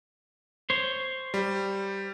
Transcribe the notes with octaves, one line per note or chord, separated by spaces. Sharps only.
C5 C#5
G3